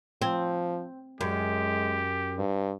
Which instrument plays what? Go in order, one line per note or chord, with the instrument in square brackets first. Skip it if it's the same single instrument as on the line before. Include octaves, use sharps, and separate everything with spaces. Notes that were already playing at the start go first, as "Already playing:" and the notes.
[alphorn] F3 [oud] C4
[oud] F#2 [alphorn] G#3 [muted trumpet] G4
[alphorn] G2